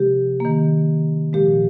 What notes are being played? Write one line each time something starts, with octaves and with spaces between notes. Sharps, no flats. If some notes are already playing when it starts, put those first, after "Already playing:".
Already playing: C3 F3 G#3 G4
D#3 A#3
A#2 F3 G#3 G4